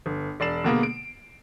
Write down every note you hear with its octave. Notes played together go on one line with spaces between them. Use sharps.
G1
E1 D5 C7 E7
B2 D3 G#3 A#3 B3
D7